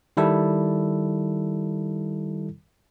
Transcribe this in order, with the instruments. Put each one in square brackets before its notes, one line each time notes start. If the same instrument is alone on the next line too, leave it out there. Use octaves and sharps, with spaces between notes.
[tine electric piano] D#3 G3 E4 A4